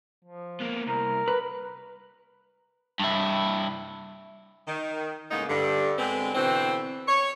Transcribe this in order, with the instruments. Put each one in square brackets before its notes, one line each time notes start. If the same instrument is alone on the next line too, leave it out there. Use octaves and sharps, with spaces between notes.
[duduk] F3
[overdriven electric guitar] A#3 B3
[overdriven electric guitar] C2 [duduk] A#4
[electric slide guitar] B4
[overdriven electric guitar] G2 E4
[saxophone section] D#3
A2 C#3 G#3 A#3 B3 D#4
G2 D3
D3 G#3 B3 C4
B2 D3 E3 C4
C#5